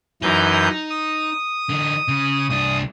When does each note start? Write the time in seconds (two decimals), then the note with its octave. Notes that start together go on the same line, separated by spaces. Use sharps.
0.22 F#2 E3 D#4 G6
0.90 D#6
1.69 D3 D#4
2.08 C#3
2.49 C2 D4 D#6